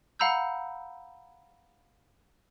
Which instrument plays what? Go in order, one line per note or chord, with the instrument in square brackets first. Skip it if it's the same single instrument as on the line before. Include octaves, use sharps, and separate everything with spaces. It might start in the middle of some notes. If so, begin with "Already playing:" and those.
[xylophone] F5 F#5 A#5 B5 E6 G6